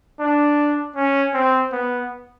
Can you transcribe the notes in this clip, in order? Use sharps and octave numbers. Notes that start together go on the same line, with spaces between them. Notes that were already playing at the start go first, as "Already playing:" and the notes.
D4
C#4
C4
B3